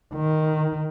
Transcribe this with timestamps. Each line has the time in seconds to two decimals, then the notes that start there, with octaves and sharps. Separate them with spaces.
0.15 D#3